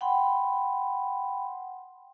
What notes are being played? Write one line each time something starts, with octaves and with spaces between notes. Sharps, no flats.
F#5 G5 B5 C6